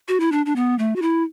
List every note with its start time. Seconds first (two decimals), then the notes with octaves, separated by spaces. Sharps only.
0.08 F#4
0.20 E4
0.32 D4
0.46 D4
0.56 B3
0.79 A3
0.96 F#4
1.02 E4